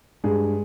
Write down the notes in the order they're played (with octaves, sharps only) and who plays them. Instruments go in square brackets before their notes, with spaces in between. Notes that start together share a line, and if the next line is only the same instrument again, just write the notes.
[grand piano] G2 G#3 G#4